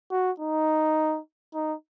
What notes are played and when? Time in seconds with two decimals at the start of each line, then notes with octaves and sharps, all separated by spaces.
0.11 F#4
0.40 D#4
1.54 D#4